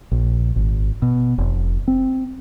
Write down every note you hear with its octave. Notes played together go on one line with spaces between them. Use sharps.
A#1
G#1
B2
F1
C4